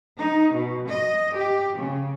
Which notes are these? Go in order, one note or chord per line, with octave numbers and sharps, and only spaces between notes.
D#4
B2
D#5
G4
C#3